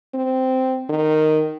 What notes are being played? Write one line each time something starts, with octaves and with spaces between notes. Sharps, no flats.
C4
D#3